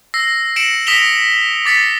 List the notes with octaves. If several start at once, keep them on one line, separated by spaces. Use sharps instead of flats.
E6 A#6 C7
A#6 C#7 D7 E7 F#7
D#6 A#6 B6 E7 F7 G7
D6 A6 B6 C#7